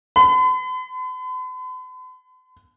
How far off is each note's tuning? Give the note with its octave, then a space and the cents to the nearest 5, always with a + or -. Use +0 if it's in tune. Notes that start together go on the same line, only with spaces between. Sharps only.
B5 +45